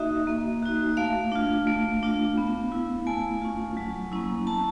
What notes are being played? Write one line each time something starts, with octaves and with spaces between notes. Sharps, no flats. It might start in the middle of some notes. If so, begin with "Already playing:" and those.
Already playing: A#3 D#4 F#4 D#5 E5
A#3
D#4 F#4
A3 F5
D4 F4
A3
D4 F4
B3
E4
A3 G#5
C#4 F4
F#3
A#3 C#4 E4
B3 A5